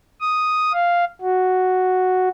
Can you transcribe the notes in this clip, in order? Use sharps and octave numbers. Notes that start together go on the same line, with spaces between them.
D#6
F5
F#4